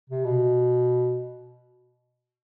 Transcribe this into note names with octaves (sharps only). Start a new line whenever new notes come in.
C3
B2